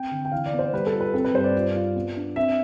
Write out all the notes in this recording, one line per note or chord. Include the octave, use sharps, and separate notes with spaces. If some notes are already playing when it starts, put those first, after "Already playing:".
Already playing: C4 G5
D3
G5
E3 F5
D5
B3
C5
G3 B4
A4
F4
B4
C4 A4
B4
G2 C5
D5
F4
F4
B3
D4
C4 E5